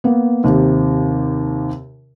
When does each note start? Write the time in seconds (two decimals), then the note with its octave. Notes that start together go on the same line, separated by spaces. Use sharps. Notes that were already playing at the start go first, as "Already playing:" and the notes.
0.04 A#3 B3
0.44 D#2 C3